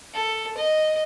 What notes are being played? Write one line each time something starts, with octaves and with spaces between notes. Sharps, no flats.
A4
D#5